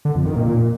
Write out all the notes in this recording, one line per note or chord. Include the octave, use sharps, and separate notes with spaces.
D3
F2
D#3
A#2